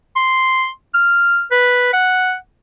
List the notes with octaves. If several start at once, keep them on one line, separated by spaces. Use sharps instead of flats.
C6
F6
B4
F#5